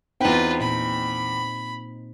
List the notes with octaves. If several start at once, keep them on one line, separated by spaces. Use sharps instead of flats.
E2 C4 D#4 F4 B4 C5 G5
A#2 B5